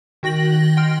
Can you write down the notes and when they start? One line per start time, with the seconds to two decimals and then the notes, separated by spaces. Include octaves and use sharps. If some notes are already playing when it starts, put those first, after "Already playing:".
0.23 D#3 F#4 G5 A#6 F#7
0.77 G5 C6 F6